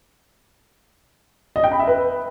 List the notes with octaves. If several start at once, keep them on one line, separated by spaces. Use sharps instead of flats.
D#5
G5
B5
E5
B4